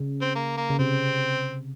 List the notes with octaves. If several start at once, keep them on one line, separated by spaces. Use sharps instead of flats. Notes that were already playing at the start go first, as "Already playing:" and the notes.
Already playing: C#3
C4
A#3
A#3
C#3
C3 C4